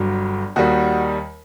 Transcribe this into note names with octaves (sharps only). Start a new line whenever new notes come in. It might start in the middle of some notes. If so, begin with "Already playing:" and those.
Already playing: G1 G2 F#3
D#2 D#3 G3 F#4